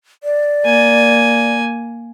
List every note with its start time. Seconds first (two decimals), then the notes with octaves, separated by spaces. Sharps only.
0.23 D5
0.65 A#3 G#5